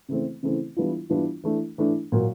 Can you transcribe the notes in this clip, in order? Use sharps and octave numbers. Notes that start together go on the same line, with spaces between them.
C#3 E3 A3 C4
C#3 E3 A3 C4
E3 G3 B3 D4 F4
E3 G3 B3 D4 F4
E3 A3 D4
E3 A3 D4
A#2 F#3 A#3